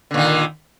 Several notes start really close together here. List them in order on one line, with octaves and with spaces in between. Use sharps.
D3 A#2 D#3